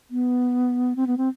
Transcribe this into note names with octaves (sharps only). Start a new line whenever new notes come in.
B3
C4
B3
C4